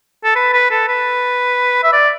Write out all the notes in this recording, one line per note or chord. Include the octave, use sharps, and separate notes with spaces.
A4
B4
B4
A4
B4
E5
D5